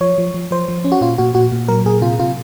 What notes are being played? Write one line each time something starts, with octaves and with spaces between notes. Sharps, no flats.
F3 C#5
F3
F3
F3 C5
F3
C#4
F#4
A#2 F4
A#2 F#4
A#2 F#4
A#2
F#3 A#4
A#2 G#4
C3 F4
C3 F4